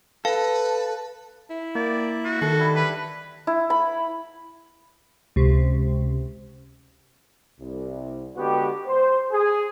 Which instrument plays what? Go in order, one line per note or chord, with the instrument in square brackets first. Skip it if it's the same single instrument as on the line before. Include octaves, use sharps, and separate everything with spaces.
[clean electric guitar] A4 [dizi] B4 [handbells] F5
[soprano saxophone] E4
[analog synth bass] A#3 [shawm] D5 [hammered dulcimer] G5
[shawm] F#4
[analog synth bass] D#3 [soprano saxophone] A4
[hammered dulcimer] G3 D4 E4
[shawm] B4
[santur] E4
B5
[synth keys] C#2 C3
[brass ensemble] C2
D3 G#3 B3 F#4 G4
C5
G#4